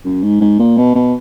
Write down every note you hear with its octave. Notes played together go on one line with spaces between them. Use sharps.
F#2
G#2
G#2
A#2
B2
B2